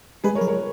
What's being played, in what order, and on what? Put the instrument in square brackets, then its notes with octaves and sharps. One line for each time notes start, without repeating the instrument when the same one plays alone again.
[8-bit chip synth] G#3 [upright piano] G#4 B4
[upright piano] A#4 C#5
[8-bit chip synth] F#3
[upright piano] A#4 C#5